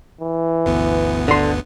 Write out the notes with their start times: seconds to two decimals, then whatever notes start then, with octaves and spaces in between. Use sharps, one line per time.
0.21 E3
0.65 G1 D2 B3
1.28 D3 C6